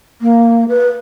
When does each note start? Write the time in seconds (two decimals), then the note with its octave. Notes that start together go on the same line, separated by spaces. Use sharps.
0.22 A#3
0.69 B4